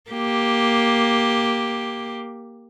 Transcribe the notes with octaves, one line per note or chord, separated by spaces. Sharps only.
A#3 G4